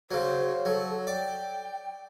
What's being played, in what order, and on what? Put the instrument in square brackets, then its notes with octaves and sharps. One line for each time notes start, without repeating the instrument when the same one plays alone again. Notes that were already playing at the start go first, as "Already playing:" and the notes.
[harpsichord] C#3 F#3 [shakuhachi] C5
[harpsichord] F#3 [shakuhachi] A4
[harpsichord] D5 [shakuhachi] G5